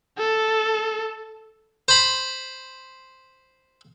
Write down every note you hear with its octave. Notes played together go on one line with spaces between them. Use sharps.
A4
C5 B5